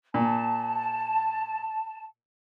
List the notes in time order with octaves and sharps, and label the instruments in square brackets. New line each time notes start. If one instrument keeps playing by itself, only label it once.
[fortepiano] A#2 [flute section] A5